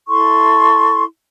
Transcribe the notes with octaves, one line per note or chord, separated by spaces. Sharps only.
E4 A4 C6 C#6